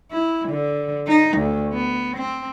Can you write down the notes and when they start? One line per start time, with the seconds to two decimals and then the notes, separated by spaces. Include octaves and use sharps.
0.11 E4
0.49 D3
1.07 D#4
1.38 D2
1.73 B3
2.17 C4